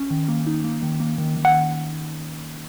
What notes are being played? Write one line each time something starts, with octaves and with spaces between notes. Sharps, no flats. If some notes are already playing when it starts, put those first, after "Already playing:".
Already playing: C#4
D#3
A#3
D#4
A#3
D#3
A#3
D#3
D#3
F#5